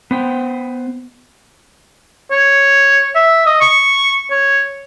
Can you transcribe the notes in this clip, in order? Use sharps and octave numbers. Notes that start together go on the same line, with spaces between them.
B3 C5 G5
C#5
E5
D#5
C#6
C#5